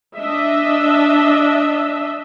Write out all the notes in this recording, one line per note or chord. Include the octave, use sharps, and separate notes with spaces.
D4 D#5 E5